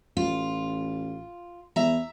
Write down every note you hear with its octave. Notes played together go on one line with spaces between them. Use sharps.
A1 F4
E2 E5 A#5